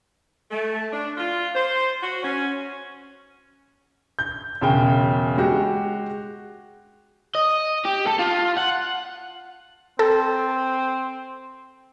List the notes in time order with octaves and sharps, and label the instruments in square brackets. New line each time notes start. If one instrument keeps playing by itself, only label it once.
[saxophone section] A3
D4
F4
C5
F#4
C#4
[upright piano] G6
E1 C#3 G5
G#3 F#4 G4
[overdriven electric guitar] D#5
G4
A4
F4
F#5
[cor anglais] C4 [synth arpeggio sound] A4